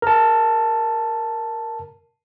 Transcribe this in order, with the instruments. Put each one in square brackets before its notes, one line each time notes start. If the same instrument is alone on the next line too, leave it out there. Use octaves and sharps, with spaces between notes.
[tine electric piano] A#4 A5